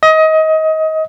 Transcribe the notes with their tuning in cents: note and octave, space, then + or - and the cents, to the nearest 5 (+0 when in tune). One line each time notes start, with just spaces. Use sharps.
D#5 +25